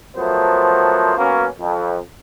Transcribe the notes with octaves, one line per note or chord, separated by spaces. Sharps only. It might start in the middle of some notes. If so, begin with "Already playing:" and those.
F3 F#3 A3 B3 A#4 C5
F#3 A#3 B3 C#4
F2